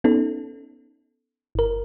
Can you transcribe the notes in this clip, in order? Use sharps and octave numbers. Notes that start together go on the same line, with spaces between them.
B3 C#4 D#4 A4
G1 A#4